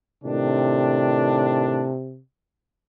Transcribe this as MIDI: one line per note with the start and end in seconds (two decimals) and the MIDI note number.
0.24 1.91 45
0.24 2.20 48
0.24 1.91 51
0.24 1.91 62